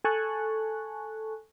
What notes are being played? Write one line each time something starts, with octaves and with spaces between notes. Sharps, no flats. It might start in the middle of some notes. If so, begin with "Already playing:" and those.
A4 G#5 A5 C#6 F#6